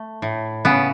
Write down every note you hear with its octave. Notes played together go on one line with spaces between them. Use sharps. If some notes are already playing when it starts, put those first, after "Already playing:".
Already playing: A3
A2
C#3 B3